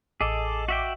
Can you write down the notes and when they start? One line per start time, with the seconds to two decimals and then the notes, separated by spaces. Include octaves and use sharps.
0.21 A1 G#4 A4 D#5 D6
0.69 F#4 E5 G5